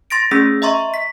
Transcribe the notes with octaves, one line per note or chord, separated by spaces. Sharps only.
C6 A6 A#6 D7
A3 C#4 G#4 E6 A#6
D#5 E5 A#5 C6 C#6
B6